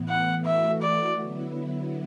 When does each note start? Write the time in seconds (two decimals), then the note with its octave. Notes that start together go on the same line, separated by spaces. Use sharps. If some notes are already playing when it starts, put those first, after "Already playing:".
Already playing: A2 E3 B3
0.08 F#5
0.45 E3 A3 F#4 E5
0.82 D5
1.19 D3 F#3 B3 E4